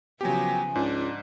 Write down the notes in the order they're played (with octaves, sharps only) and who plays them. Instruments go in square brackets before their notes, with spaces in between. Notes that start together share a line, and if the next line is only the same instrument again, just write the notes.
[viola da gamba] C#3 F3 B3 [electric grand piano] F#3 G4 [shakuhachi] G#5
[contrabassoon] C#2 [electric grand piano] G#2 [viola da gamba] D4